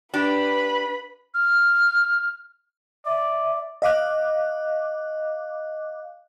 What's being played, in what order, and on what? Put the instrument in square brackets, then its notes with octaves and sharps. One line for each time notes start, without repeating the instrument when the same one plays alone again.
[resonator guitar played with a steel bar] D4 G4 [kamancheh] B4 B5
[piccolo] F6
[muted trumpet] D5 [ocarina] E5
[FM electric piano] D#5 F5 D6 F#6